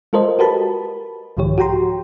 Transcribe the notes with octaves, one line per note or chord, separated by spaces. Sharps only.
G#3 F4 A4 A#4 C5 D#5
F#4 G4 A#4 B4 A5 B5
C2 G#2 D#3 F3 G4 C#5
F#4 G4 G5 A#5 C6